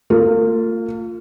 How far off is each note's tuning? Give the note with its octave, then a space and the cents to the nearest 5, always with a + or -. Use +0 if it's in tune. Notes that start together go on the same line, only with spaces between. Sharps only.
A#3 -45 F4 +0